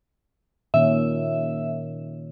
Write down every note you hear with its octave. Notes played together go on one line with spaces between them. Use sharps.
A#2 D#3 C#4 E5